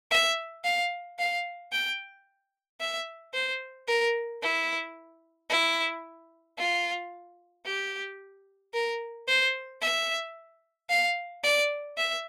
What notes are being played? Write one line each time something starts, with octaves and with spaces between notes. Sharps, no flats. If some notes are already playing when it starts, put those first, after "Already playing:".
E5
F5
F5
G5
E5
C5
A#4
E4
E4
F4
G4
A#4
C5
E5
F5
D5
E5